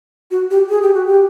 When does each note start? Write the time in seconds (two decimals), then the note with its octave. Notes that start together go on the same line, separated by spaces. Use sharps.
0.31 F#4
0.51 G4
0.69 G#4
0.82 G4
0.94 F#4
1.06 G4